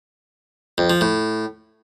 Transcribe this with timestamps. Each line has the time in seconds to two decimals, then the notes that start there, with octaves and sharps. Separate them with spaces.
0.78 F2
0.90 F3
1.01 A2